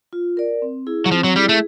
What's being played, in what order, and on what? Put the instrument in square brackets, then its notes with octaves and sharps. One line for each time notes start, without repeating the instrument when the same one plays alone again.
[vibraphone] F4
A#4 D5
C4
E4 G#4
[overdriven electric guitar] F#3
[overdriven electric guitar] F3 [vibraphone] C4
[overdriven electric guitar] F#3
[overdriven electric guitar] G3 [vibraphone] E4 G#4
[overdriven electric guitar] A3